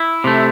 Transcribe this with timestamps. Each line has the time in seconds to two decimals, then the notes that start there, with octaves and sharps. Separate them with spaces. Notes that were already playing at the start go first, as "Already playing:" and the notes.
Already playing: E4
0.24 C3 A3